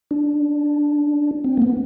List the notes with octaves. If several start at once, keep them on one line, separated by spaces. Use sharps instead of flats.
D4
C4
A#3
B3